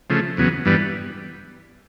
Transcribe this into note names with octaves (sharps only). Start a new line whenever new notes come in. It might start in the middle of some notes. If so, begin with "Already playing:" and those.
C#3 F3 A3
E2 C#3 F#3 B3
G2 E3 G3 B3